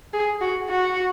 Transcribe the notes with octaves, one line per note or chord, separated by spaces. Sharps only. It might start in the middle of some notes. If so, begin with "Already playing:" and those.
G#4
F#4
F#4